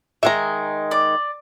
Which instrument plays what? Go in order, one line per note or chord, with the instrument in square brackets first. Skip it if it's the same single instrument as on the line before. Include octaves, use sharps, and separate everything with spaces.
[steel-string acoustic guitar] D#3 G#3 [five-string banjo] E5 A#5
[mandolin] D5